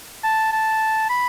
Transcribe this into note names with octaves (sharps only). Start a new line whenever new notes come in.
A5
A5
B5